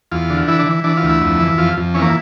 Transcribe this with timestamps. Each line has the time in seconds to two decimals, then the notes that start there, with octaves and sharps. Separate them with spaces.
0.12 E2 F4
0.30 D3
0.47 E3 E4
0.59 D4
0.67 E3
0.84 E3 D4
0.97 F4
1.03 D2
1.09 E4
1.21 F2
1.40 E3
1.58 F2 F4
1.77 F2
1.94 E3 C#4
2.02 A#3